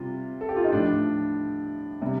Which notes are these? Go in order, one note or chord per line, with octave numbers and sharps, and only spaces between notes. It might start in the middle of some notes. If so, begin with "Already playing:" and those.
Already playing: C3 G3 F4
A4
G4
F4
D#4
A2 F3 D4
C3 G3